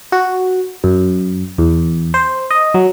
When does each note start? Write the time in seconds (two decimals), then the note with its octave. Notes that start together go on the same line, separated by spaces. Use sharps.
0.12 F#4
0.84 F#2
1.58 E2
2.14 C5
2.51 D#5
2.74 F#3